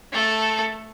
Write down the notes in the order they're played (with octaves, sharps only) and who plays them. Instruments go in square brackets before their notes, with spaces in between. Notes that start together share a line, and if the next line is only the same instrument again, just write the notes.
[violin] A3 A4